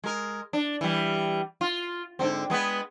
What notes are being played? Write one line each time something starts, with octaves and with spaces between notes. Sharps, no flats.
G#3 A#4
D4
E3 G3
F4
G#2 D3 C4
G#3 B3 B4